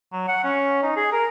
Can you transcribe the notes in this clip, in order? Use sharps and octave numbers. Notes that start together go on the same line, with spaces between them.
F#3
F#5
C#4
D#4
G#4
A#4